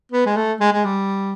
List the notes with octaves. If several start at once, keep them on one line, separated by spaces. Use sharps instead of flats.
B3
G#3
A3
G#3
G#3
G3